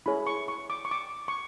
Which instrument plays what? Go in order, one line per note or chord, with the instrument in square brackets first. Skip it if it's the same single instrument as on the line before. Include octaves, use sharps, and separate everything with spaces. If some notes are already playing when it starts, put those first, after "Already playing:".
[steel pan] E4 G#4 C#5 B5
C#6
C#6
D6
C#6
D6
C#6